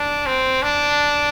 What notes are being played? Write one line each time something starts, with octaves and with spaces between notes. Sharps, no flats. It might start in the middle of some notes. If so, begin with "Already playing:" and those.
Already playing: D4
C4
D4